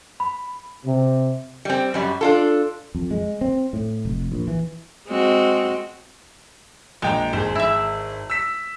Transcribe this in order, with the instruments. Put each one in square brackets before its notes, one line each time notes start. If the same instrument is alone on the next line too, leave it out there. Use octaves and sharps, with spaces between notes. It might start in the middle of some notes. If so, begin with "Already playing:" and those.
[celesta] B5
[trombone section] C3
[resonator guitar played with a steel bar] G3 C4
F#2 G3
D4 F4 A4
[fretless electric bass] F2
G#3
C4
A2
F1
A#1
E3
[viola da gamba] G#3 C4 F#4
[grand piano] A#1 G5 A#5 [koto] G#3
[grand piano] G#1 G#4 [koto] C5
[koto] E4 E5
[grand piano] E6 B6